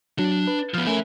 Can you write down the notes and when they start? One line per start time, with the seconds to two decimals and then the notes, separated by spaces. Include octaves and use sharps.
0.19 F#3 D4
0.47 B4
0.74 F3 B3 F6
0.87 A3 C#4 A#4 E5 G#5